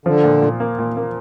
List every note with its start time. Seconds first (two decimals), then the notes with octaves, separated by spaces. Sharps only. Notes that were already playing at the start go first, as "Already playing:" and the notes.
0.05 D3 F3
0.24 A#2
0.42 A#2
0.60 A#3
0.79 A#2
0.97 A#3